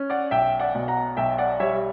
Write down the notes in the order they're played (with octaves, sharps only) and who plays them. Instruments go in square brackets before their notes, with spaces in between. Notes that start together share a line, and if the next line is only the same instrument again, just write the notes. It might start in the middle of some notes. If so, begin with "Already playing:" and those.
Already playing: [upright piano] C#4
D5 F#5
B1 E5 G5
D5 F#5
B2
F#5 A#5
B1 E5 G5
D5 F#5
G3 C#5 E5